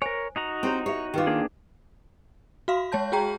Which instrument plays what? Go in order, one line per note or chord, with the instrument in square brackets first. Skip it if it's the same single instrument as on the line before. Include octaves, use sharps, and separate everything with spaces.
[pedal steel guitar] A#4 C#5 [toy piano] C5 G#5
[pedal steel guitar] D#4 F#4 A#5
[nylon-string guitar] C4 [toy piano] E4 G4 C#5
[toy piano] G4 E5 [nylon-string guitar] C#5
[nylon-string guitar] D#3 F4 [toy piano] G4 B4 D6
[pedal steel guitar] A#3 D4 G#4
[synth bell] F#4 F5 C6
G#3 C#5 A5 G6
F#4 G#4 G5 A#5